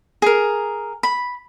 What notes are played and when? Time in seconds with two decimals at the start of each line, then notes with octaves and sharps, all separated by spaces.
0.22 G#4 A#4
1.03 B5